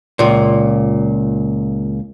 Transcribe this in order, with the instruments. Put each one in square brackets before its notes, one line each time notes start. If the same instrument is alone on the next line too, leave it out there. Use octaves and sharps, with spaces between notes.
[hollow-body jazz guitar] C#2 A#2